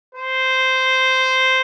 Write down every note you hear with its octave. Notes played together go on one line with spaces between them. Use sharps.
C5